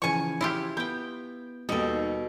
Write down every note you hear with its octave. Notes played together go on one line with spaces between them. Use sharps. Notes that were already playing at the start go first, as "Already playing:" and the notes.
C#3 E3 F3 G#5 C#6
E4 F4 G4
B3 G5 G6
D#2 B2 G3 D#4 A4